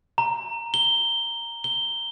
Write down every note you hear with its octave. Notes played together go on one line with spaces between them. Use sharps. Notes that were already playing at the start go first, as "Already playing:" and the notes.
A#5
G7
G7